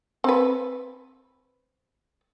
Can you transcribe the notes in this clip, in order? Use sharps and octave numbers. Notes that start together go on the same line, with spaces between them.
C4 B4